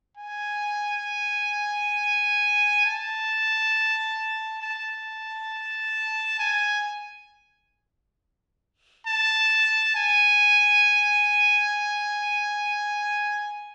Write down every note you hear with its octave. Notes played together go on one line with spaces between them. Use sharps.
G#5
A5
A5
G#5
A5
G#5